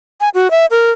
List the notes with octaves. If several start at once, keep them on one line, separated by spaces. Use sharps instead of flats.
G#5
F#4
E5
A#4